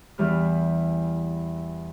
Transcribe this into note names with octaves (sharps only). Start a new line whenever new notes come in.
E2 E3 G3 F6